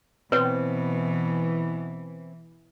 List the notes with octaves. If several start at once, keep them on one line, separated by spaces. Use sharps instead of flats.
B2 E3 C4 B4 C#5